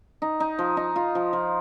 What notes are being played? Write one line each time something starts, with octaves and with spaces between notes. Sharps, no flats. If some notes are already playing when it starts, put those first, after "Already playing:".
D#4
D#4
F3
D#4
F4
F3
F3